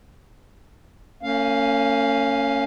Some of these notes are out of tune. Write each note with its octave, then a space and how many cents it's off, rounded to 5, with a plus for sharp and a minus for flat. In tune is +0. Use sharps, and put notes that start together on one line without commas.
A#3 -45 C#4 +0 F5 +0